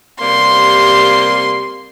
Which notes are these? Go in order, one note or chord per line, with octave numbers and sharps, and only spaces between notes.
C3 G3 A#3 C6